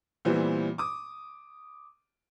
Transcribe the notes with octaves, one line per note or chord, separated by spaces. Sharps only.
A#2 E3 G3 B3 C4
D6 D#6